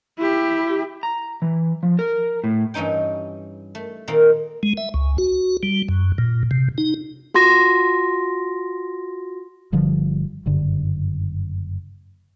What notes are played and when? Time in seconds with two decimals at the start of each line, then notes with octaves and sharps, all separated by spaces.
0.19 E4 G4
1.03 A#5
1.42 E3
1.83 F3
1.99 A#4
2.44 A2
2.74 G2 E3 C#4 D#4 G5
3.75 A3
4.07 A#2 D#3 A#3 C4
4.63 G#3
4.77 E5
4.94 C#2
5.18 F#4
5.63 G3
5.89 F#2
6.18 A#2
6.51 C3
6.78 D#4
7.34 F4 F#4 C6 A#6
9.72 G1 D3 F3 G3
10.46 F#1 G2 D3